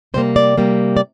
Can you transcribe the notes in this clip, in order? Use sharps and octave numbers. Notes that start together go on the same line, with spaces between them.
C3 G3 A#3 C5
D5
C3 G3 A#3
D5